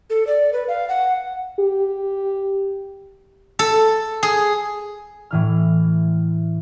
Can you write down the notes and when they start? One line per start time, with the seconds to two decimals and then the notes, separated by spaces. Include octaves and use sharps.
0.10 A4
0.27 D5
0.53 B4
0.68 F5
0.89 F#5
1.60 G4
3.59 A4
4.23 G#4
5.31 A2 E3 F6